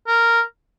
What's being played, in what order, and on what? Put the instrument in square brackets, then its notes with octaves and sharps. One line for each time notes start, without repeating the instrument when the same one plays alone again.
[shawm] A#4